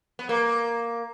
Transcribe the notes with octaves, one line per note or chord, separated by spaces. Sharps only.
B3
A#3